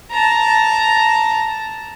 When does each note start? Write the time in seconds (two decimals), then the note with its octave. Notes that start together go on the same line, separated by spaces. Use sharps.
0.12 A5 A#5